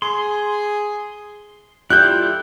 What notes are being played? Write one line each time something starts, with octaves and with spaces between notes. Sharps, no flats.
G#4 C6
G3 E4 F4 A4 F#6 G6